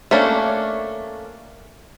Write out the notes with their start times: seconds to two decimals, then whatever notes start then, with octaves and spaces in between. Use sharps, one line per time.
0.11 A3 A#3 C#4 D4